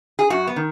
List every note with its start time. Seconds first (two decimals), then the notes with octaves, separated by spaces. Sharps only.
0.19 G#4
0.30 F#2 F#4
0.47 B3
0.56 D#3